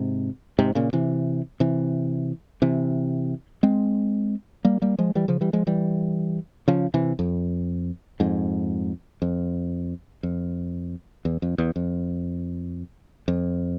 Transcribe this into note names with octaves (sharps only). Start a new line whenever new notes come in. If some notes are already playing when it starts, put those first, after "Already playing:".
Already playing: G#2 C3
G#2 C3
A#2 C#3
C3 E3
C3 E3
C3 E3
G#3 C4
G3 A#3
G3 A#3
F3 G#3
E3 G3
C#3 F3
E3 G3
F3 G#3
E3 G3
C#3 F3
C3 E3
F2
F2 G#2
F2
F2
E2
F2
E2
F2
F2